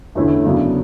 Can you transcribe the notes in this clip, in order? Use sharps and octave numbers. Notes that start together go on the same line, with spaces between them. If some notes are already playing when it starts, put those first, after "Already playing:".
E2 D3 A3 C#4 E4
F#2 C#3 F#3 B3 D4